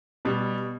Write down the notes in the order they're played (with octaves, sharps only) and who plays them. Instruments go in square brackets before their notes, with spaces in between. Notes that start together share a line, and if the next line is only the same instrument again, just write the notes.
[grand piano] B2 [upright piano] G3